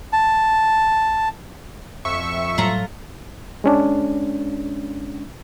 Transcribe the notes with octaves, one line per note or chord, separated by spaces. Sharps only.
A5
F2 E5 C#6
A2 F#3 G3 A3 F4 A#5
G#3 C#4 D4